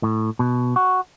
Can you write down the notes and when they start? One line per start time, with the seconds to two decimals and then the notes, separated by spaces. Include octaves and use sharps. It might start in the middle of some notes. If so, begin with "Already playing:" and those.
0.03 A2
0.39 B2
0.76 F#4